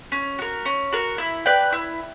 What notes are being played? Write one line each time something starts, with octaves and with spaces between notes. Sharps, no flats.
C#4
F#4 A#4
C#4
F#4 A#4
E4
B4 D5 G5
E4